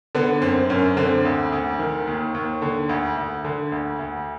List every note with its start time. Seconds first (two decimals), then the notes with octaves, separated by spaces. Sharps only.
0.15 D3 B3
0.42 F#2 C4
0.69 F#2 C#4
0.97 D3 C4
1.25 D2
1.52 D2
1.79 D#3
2.07 D#2
2.35 D#2
2.62 D3
2.89 D2
3.17 D2
3.45 D3
3.72 D2
3.99 D2